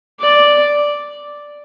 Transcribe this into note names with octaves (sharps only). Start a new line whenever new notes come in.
D5